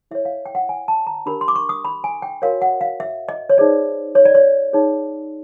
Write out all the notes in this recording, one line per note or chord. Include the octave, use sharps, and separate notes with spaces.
E4 A4 C#5 E5
F5
G5
F#5
G#5
A5
A#5
D4 G4 A#4 B5
C6
D6
C#6
D#6
B5
G#5
G5
F#4 A#4 C#5 F5
F#5
F5
E5
D#5
C#5
D#4 G#4 C5 D5
C#5
D5
C#5
D#4 G#4 C#5